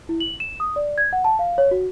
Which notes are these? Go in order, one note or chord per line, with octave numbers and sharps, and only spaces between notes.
E4
F#7
E7
D#6
D5
G#6
F#5
A5
F5
C#5
F#4